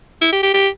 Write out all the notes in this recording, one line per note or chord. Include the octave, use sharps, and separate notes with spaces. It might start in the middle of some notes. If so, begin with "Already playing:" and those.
E4
G4
G4
G4